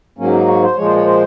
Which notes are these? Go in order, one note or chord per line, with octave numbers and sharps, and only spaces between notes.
G#2 F#3 A#3 C#4
D#4
C#5
C5
A#2 F3 G#3 C#5
C5
C#5
C5